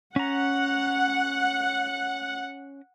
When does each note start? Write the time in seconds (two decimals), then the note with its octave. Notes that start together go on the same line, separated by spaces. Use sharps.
0.16 C#4 F#5 A#5